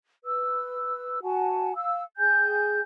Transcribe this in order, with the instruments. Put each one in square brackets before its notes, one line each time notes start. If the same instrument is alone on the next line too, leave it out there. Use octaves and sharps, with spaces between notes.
[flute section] B4 E6
F#4 F#5 G#5 A5
F5 E6
G#4 G5 G#5 G6